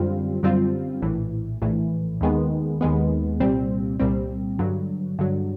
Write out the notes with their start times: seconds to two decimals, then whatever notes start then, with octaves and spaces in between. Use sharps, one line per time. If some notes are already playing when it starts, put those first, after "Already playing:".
Already playing: F#2 D3 G3 C4 F4
0.43 F#2 D3 G3 C4 F4
1.02 A#1 A2 E3
1.62 A#1 A2 E3
2.21 D#2 D#3 G#3 B3
2.81 D#2 D#3 G#3 B3
3.40 C2 A#2 G3 C4
4.00 C2 A#2 G3 C4
4.59 G2 D3 F#3
5.18 G2 D3 F#3